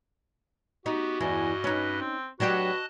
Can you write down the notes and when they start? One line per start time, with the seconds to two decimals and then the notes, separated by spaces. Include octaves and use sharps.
0.86 B3 D#4 F#4 G4
1.20 E2 G2 E4 D#5 G#5
1.64 C#4 D#4 B4
2.01 C4
2.40 F#3 D4 F#4 G4 B4 D#5 A5 F#6